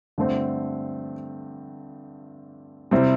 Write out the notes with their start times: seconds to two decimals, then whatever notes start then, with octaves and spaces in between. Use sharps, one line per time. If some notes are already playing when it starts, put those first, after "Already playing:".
0.18 G2 D3 A3 C4
2.91 C3 G3 C4 E4